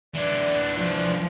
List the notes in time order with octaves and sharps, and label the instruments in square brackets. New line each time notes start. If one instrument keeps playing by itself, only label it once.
[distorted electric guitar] E3 D4 [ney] D5
[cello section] F3